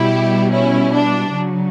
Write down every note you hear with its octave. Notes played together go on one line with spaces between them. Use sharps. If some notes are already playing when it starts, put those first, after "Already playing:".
Already playing: B2 G3 E4 G4
C#4 E4
D4
C#3 F#3